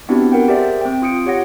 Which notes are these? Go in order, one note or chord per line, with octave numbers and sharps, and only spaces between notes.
B3 C4 D4 E4 F#4 G4
A#4 F#5 G5
G4 G#4 A#4 C5 D5 E5
C4 G5
F4 D#6 C#7 D7
G4 C#5 F#5 A#6